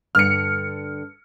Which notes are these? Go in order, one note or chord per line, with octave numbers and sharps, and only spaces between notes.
G2 D3 F6 C#7